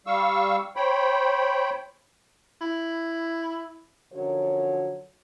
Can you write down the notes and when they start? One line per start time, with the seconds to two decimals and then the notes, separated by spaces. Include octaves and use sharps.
0.07 G3 F5 C#6 E6
0.76 C5 C#5 G5 B5
2.61 E4
4.13 F#2 D3 F3 F#3 A4 C#5